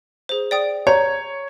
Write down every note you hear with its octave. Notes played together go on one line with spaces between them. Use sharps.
G#4 C5
D5 G5 D#6
C#5 A#5 G6